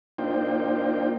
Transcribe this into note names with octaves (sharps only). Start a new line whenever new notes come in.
A#3 D4 D#4 F4 C5 G5